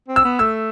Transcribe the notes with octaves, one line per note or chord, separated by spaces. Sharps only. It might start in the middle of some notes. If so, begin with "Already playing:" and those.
C4
E6
B3
A3 E6